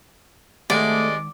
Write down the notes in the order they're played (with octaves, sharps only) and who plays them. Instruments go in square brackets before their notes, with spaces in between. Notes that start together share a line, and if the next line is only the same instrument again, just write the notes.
[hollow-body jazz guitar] G#2 D#3 F#5 [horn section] C3 G#3 [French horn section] A3 [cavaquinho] D5